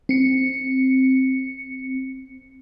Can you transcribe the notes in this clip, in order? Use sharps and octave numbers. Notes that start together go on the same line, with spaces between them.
C4 C#7